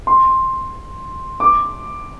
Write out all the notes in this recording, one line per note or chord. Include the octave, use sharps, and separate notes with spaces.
C6
D6